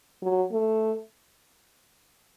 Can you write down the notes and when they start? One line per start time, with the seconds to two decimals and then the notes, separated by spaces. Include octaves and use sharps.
0.22 F#3
0.52 A3